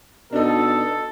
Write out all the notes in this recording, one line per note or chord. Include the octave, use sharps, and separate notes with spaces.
B2 D4 D#4 A4